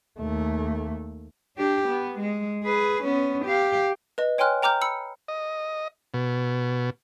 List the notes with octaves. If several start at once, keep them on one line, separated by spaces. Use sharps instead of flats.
D#2 A3
D4 G4
B3
G#3
G#4 B4
B3 C#4
G4 F5
B4 D#5
C#5 G5 G#5 C6 F6 F#6
G5 A#5 D6 F6 G6
B5 E6 C#7
D#5
B2